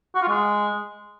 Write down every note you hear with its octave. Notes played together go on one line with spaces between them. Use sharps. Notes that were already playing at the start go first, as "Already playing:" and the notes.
F#4
F4
G#3